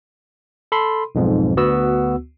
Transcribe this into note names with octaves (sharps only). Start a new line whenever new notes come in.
A4 B5 C6
B1 F2 G#2
D2 B3 F#4 E6